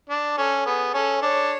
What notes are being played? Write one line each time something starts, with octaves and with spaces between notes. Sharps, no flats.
D4
C#4 A4
B3 G#4
C#4 A4
D4 C#5